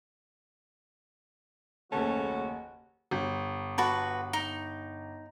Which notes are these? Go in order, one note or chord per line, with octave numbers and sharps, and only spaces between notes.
F#1 D#2 C#3 A3 C#4 F#4 A5
G1
F#4 B4 A5
D#4